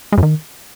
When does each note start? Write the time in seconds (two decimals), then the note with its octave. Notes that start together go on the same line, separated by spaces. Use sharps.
0.12 G#3
0.18 F#2
0.23 D#3